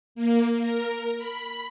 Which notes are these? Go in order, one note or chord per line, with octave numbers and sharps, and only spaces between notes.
A#3
A#4
B5